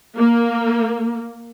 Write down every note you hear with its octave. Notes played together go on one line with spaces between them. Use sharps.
A#3